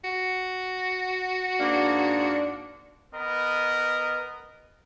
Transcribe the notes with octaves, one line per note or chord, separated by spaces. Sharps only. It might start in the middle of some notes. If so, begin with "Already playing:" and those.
F#4
G#2 A#3 D4
B3 A#4 B4 D#5